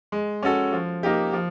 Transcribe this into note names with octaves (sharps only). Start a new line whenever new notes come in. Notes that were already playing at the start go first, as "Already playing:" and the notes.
G#3
C#4 F#4 A4
F3
A#3 D#4 G4
F3